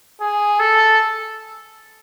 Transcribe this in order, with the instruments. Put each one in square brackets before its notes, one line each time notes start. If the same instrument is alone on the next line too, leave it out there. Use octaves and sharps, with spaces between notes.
[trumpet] G#4
A4